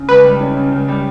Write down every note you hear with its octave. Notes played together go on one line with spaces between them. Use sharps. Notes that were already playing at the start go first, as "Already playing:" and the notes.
Already playing: C#3
C#2 B4
G3
C#4
C#3
C#2
G3